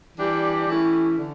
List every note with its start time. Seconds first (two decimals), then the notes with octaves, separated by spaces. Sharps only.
0.18 E3 G3 D4 G4
0.68 E3 A3 C#4 E4 G4
1.19 D3